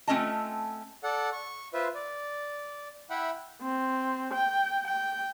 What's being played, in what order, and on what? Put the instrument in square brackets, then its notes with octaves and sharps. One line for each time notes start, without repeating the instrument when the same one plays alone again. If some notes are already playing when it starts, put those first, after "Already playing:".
[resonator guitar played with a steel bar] A3 C4 C#4 F4 D#5 A5
[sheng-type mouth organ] A4 D5 F#5
C#6
F4 B4 C5 E5
D5
E4 E5 F#5 G5 B5
[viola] C4
G5
G5